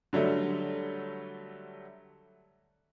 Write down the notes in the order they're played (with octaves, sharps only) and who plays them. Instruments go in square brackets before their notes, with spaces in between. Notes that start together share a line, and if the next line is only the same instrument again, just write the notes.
[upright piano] D3 F#3 G3 A3